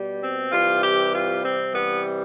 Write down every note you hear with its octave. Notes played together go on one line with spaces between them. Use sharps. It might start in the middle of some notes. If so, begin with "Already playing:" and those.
Already playing: B2 G3
C4
C3 E3 G3 F4
G4
F4
C4
C3 E3 G3 B3